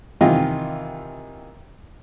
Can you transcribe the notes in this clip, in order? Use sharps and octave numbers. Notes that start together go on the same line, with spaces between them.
C3 D#3 E3 F4 D#5